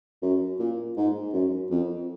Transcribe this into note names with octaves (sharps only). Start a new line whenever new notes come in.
F#2
A#2
G#2
F#2
F2